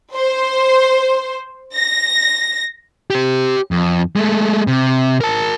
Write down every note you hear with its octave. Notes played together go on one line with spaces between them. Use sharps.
C5
A#6
G4 C5
F2
G#3 A3
C3
A#4 A5